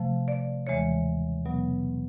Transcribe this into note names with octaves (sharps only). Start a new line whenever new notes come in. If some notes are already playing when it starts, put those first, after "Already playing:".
Already playing: C3 F3 A3
D5
D#2 C#3 E3 G#3 C#5
B2 F#3 B3